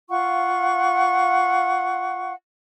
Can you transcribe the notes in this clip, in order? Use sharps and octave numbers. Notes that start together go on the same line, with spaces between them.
F4 F5 F#5 C#6